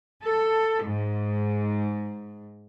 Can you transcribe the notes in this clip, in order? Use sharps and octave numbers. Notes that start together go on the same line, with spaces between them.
A4
G#2